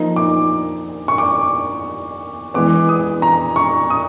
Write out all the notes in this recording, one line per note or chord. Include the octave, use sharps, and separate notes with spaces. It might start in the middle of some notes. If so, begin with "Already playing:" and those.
Already playing: F3 A#3 D#4
D6
C#6
D6
E3 G#3 B3 D6
D#6
A#5
C#6
D#6